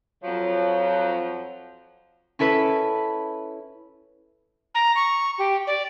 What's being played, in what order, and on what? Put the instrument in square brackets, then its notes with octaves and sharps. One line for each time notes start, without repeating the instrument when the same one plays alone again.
[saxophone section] F2 F3 F#3
[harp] C#4 E4 A4 B4
[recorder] A#5
C#6
G4
D5